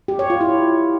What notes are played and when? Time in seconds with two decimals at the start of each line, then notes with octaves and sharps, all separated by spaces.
0.08 G4
0.19 C#5
0.30 F4
0.41 E4